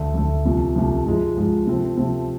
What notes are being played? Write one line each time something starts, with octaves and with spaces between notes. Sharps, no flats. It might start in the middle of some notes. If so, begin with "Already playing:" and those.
Already playing: D2 D3 A3
D2 D3 A3
C2 C3 F3 A3
C2 C3 F3 A3
G#2 F3 G#3
G#2 F3 G#3
C3 F3 A3 C4
C3 F3 A3 C4